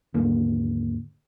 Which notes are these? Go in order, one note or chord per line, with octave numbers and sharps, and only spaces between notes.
D#2 G#2 D3 A#3